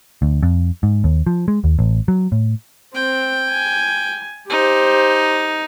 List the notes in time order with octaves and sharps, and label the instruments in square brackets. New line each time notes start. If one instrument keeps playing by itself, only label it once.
[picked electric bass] D2
F2
G#2
D#2
F3
G#3
D#2
A1
F#3
A2
[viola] C4 [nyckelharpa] G5
[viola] G#5
[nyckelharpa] D#4 [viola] G4 C5